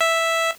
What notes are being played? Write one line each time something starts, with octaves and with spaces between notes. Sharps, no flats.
E5